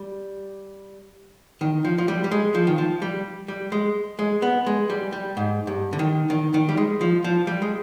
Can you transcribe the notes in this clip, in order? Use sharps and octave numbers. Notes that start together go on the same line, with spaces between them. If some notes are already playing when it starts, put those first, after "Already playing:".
Already playing: G3
D#3
F3
F3
G3
G3
G#3
F3
D#3
F3
G3
G3
G#3
G#3
B3
G#3
G3
G3
G#2
G2
D3
D#3
D#3
D#3
G3
G#3
F3
F3
G3
G#3